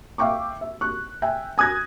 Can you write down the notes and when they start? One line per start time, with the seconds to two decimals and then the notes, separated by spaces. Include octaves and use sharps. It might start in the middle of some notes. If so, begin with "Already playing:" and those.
0.18 E5 F5 G5 C#6 D6
0.61 E5
0.81 C#6 F#6
1.22 E5 G5 G#5
1.58 G#5 D#6 F#6 G#6 A#6